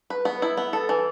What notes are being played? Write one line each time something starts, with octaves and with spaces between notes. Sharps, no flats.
B4
B3
E4
B3
A4
E3